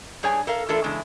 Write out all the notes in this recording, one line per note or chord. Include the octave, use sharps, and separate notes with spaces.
G2 G#4 C#5 D5 G#5
A4 A#4 F5
E3 A3 D4 F4 A4 A#4
E2 C#3 G#3 D4 E4